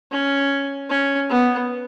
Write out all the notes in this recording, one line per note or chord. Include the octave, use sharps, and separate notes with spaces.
C#4
C#4
B3